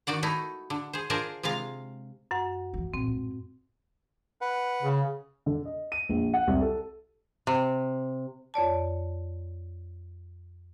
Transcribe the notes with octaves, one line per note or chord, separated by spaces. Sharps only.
D#3 F#4 D5 F#5
A3 D#4 E4
D3
G#4 C5
D4 F4 G#4 A#4 C5 A5
C3 G#3 F4 F5
F#2 F#5
E3 G3
A#1 C4
A2 G#3
B4 F#5
C#3
D3
D#5
D#7
A#1
F#5
C2
A4
C3
F2 C#5 D5 A5